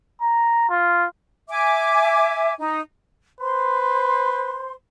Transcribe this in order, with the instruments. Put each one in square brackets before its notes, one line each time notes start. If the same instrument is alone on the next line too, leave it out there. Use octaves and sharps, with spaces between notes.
[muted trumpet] A#5
F4
[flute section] E5 G#5 D6
D#4
[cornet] B4 [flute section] C5 C6